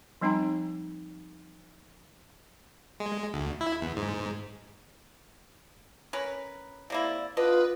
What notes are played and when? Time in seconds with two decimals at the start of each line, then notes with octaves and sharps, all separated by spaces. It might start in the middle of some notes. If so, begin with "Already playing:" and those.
0.21 F3 G3 C4 D#4 G5 A#5
3.00 G#3
3.34 D2
3.61 E4
3.81 E2
3.96 G#2
6.13 C#4 A#4 B4
6.90 C3 A#3 E4 D5
7.37 D3 F4 B4 D#5